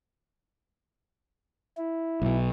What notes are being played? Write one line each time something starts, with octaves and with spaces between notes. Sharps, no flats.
E4
B1 B2